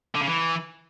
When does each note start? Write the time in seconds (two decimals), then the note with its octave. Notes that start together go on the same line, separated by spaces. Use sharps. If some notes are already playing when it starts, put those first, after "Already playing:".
0.15 D3
0.21 C#3
0.27 E3